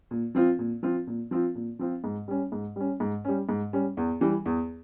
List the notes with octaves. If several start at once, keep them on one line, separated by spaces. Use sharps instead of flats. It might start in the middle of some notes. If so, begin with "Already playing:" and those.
A#2
F3 C4 F4
A#2
F3 C4 F4
A#2
F3 C4 F4
A#2
F3 C4 F4
G#2
G3 C#4
G#2
G3 C#4
G#2
G3 C#4
G#2
G3 C#4
E2
E3 G3
E2